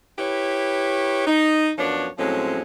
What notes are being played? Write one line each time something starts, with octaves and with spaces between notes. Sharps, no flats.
E4 G4 B4 C#5
D#4
F#2 F3 B3 D4 C#5
A2 F3 F#3 G#3 C4 C#4